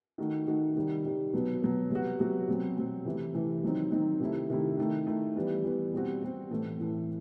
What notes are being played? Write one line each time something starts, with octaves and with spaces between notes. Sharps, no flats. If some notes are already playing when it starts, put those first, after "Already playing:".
D#3 A3 D#4 F#4
D#3 A3 D#4 F#4
C3 D#3 G3
C3 D#3 G3
B2 F#3 B3
B2 F#3 B3
C3 F#3 B3 F#4
C3 F#3 B3 F#4
B2 F#3 C4
B2 F#3 C4
C3 E3 A3 E4
C3 E3 A3 E4
D#3 F#3 C4 D#4
D#3 F#3 C4 D#4
C3 D#3 A3 E4
C3 D#3 A3 E4
D#3 A3 E4
D#3 A3 E4
E3 G3 B3
E3 G3 B3
B2 G3 C4 F#4
B2 G3 C4 F#4
A2 E3 A3
A2 E3 A3